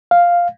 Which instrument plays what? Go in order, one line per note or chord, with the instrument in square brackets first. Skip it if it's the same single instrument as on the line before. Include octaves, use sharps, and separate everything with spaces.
[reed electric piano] F5